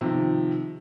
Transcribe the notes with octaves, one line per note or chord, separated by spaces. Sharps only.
C3 D#3 F3